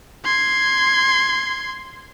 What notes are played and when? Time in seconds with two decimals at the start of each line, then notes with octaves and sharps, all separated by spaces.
0.25 C6 G#6